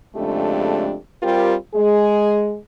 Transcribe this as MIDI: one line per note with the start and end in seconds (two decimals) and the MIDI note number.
0.16 0.95 41
0.16 0.95 49
0.16 0.95 56
0.16 0.95 57
0.16 0.95 62
0.16 0.95 67
1.22 1.54 55
1.22 1.54 60
1.22 1.54 65
1.22 1.54 67
1.22 1.54 70
1.74 2.57 56
1.74 2.57 68